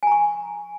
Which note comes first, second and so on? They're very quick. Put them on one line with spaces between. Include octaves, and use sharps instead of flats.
G#5 A#5 C#6